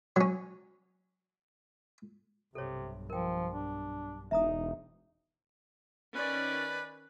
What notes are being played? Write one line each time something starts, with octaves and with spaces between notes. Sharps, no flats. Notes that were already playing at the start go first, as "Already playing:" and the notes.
F#3 C#4
B1 G2 C3 A4 C#5
F3 A#4 G5
D4
E1 D#4 E5 A#5 D#6
D#3 C#4 B4 D5